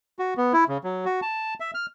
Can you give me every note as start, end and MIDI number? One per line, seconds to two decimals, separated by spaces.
0.19 0.34 66
0.37 0.53 59
0.53 0.64 64
0.68 0.78 49
0.84 1.05 54
1.05 1.20 66
1.22 1.54 81
1.60 1.71 76
1.75 1.86 89